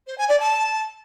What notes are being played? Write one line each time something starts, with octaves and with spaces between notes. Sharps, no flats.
C5
G#5
D5
A5